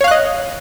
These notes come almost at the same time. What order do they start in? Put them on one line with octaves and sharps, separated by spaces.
C#5 F5 F#6 D#5